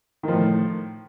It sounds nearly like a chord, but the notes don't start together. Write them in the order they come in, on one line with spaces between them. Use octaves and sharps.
D#3 F3 A2